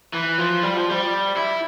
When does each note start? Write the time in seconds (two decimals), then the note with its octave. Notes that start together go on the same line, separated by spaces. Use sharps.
0.14 E3
0.38 F3
0.63 G3
0.76 F3
0.90 G3
1.36 E4